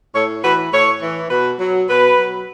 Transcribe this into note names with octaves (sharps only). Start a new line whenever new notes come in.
A2 A4 C#5
E3 F#4 B4
A2 A4 C#5
E3
B2 F#4 B4
F#3
B2 F#4 B4
F#3